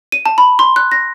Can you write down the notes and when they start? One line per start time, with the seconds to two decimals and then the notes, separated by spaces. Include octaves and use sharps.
0.12 D#7
0.26 A5
0.38 B5
0.59 C6
0.76 F#6
0.92 A#6